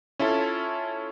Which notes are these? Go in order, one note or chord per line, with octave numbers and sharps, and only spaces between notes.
C#4 E4 F4 A4